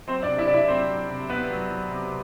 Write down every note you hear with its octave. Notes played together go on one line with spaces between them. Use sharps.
F#3 C4 C5
D4 D5
C3
E4 E5
C3 D5
E4 E5
F#3 C4 C5
F#3
C3
C3 B3 B4
F#3
F#3
C3